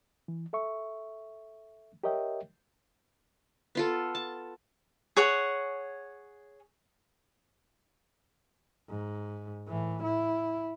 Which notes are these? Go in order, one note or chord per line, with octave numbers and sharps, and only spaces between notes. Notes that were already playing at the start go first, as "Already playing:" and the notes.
E3
A4 E5 C#6
G4 A#4 C#5 D#5 E5 G5
B3 F4 A4
A5
G#4 C#5 F#5
G#2
A2 E3
E4